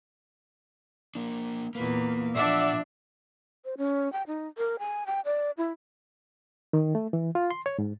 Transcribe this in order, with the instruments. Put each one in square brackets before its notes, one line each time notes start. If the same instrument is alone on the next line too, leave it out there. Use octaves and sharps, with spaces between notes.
[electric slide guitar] A#3 D4
[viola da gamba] E2 A#2 B4 [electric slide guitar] A#3
[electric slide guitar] A#2 F#5 [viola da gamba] F3 D4 [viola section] D5 E5
[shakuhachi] C5
C#4
G5
D#4
A#4
G#5
G5
D5
E4
[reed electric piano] D#3
A3
E3
F4
C6
C#5
G#2